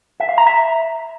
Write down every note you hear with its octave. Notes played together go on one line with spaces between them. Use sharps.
E5
F5
A#5
E5